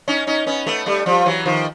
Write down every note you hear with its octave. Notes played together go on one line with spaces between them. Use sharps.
C#4 D#4
C#4 D#4
B3 C#4
A3 B3
G3 A3
F3 G3
E3 F#3
D#3 F3